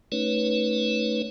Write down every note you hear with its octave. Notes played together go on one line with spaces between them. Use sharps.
A3 C#4 D#4 B4 C#5